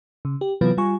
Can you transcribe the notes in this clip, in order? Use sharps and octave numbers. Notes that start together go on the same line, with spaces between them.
C#3
G4
C3 E3 F#3 B3 F4 B4
G3 F4 G#5 C#6